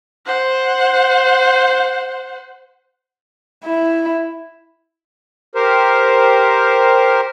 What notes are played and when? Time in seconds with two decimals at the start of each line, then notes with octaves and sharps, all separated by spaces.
0.26 C5 F#5
3.64 E4
5.55 G4 A#4 C5